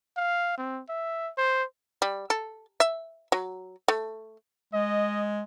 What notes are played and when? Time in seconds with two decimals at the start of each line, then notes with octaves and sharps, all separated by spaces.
0.17 F5
0.58 C4
0.89 E5
1.38 C5
2.02 G3
2.30 A4
2.80 E5
3.32 F#3
3.88 A3
4.74 G#3 D#5